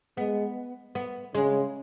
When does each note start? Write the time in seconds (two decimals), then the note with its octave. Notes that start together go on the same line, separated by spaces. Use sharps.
0.17 G#3 B3
0.95 B3
1.34 C#3 G#3